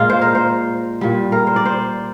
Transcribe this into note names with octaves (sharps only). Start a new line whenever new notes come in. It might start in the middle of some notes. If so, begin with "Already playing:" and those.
Already playing: A#2 G#3 F4
C5
A#4
C5
A#2 G3
A#4
C5
D5
C5